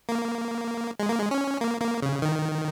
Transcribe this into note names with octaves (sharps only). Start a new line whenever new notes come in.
A#3
G#3
A#3
G#3
C#4
A#3
A#3
C#3
D#3